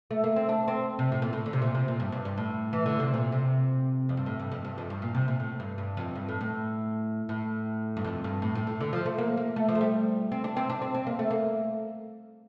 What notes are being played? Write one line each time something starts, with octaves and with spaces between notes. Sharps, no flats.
A3
A#3
C4
D4
C4
C3
A2
A#2
A2
D3
C3
A#2
C3
A#2
G2
G2
G2
A2
E3
D3
C3
A#2
C3
F2
G2
A2
G2
F2
G2
F2
G2
A#2
C3
A#2
A2
G2
G2
F2
G2
A2
A2
A2
G2
F2
G2
A2
A2
A2
D3
F3
A3
A#3
A#3
A3
F3
A3
G3
C4
D4
C4
D4
C4
C4
A#3
A3
A#3